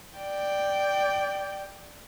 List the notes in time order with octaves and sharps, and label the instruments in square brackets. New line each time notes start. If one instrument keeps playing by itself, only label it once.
[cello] D5 G5